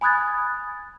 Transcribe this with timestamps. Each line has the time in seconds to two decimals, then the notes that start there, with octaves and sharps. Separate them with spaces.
0.01 G#5 B5 D#6 F#6 G#6 A6